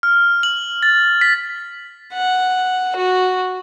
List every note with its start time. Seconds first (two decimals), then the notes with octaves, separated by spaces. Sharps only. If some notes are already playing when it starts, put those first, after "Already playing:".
0.03 F6
0.43 F#7
0.83 A6
1.21 B6
2.13 F#5
2.96 F#4